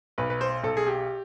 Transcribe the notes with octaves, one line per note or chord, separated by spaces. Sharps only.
B1 B4
B4
C5
B1 A4
G#4
G4